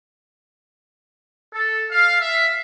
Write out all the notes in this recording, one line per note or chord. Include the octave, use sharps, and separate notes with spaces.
A4
F5
E5